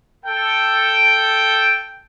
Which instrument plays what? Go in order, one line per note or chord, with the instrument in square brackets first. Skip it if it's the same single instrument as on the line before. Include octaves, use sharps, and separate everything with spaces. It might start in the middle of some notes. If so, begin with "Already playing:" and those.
[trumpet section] A4 G5